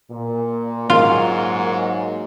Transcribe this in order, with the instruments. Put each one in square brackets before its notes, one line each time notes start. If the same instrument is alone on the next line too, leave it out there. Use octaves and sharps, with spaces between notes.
[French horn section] A#2
[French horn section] G#2 F#3 A#3 [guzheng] F4